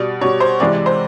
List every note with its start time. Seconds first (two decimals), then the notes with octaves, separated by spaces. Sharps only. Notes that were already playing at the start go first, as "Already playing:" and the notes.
Already playing: B2 G3 D5
0.21 B2 G3 C#5
0.40 C5
0.60 C3 E3 G#3 D5
0.73 D5
0.86 C5